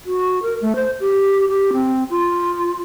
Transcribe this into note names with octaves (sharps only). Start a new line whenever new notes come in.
F#4
A#4
A3
C5
G4
G4
C4
F4